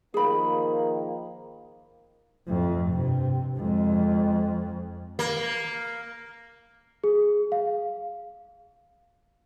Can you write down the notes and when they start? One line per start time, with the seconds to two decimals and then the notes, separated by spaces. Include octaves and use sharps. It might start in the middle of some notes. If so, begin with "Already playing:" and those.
0.14 D#3 F3 A#3 G#4 B5
2.48 F2 A3
2.91 G2 C3
3.57 F2 G#3
5.19 A#3
7.04 G#4
7.52 F5